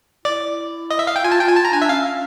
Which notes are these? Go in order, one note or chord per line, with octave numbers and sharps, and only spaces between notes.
E4 D5
D#5
E5
F5
G5
F4 G#5
A5
F4 G5
G#5
A5
A#5
D4 G#5
E5
C#4 F5